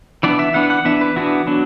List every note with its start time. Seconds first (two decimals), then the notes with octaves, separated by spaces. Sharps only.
0.23 E3 B3 D4 D5
0.39 E5
0.54 E3 B3 D4 F#5
0.70 F#5
0.85 E3 B3 D4 E5
1.01 B4
1.16 E3 B3 D4 F#4
1.47 F#3 B3 D4